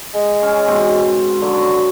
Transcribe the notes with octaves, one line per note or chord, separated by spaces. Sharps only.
G#3
C#4
G#2 B2 C4
D3 F#3